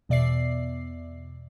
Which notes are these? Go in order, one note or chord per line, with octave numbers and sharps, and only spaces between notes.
E2 B2 D5 E5 C7